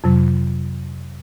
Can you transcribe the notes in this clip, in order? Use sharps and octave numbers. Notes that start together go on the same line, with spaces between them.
F2 C3 F#3